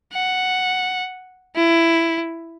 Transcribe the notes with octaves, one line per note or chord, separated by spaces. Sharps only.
F#5
E4